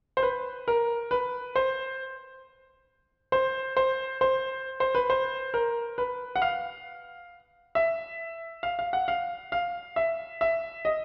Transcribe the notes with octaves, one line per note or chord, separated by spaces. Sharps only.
C5
B4
A#4
B4
C5
C5
C5
C5
C5
B4
C5
A#4
B4
F#5
F5
E5
F5
F5
F#5
F5
F5
E5
E5
D#5